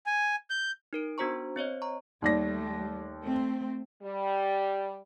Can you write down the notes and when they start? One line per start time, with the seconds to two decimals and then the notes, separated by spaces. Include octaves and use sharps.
0.06 G#5
0.50 G6
0.93 D#4 A#4 D7
1.18 B3 D4 F#4 C5 A#5 C#6
1.56 C4 C5 C#5 D#5
1.82 A#5 C#6
2.22 D#2 G3 A3 D5 A#6
3.24 A3 C4
4.02 G3